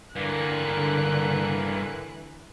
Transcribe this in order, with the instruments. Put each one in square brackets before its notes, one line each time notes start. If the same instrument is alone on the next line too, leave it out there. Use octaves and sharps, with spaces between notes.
[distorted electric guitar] G2 A#3 [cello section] D3 [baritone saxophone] E3 [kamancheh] A#4 F#6